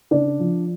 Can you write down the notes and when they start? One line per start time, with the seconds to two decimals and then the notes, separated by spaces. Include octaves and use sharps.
0.11 C#3 D4 D5
0.39 F3